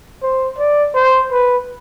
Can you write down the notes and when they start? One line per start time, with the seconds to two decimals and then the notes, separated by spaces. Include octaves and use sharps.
0.23 C5
0.59 D5
0.95 C5
1.31 B4